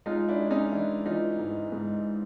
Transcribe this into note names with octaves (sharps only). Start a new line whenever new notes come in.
G#3 D#4 F4
D4 E4
G#3
C#4 D#4
E3 D4 E4
E3 D#4 F4
G#2
G#2